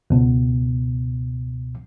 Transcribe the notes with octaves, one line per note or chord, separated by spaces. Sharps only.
C#2 B2